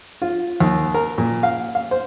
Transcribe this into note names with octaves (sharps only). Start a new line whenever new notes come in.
F4
D#2
A#4
A#2
F5
F5
C5